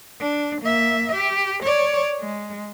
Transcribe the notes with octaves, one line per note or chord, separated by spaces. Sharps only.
D4
A#3 E5
G4
C#5 D5
G#3